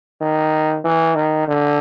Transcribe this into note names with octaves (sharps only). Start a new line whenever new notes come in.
D#3
E3
D#3
D3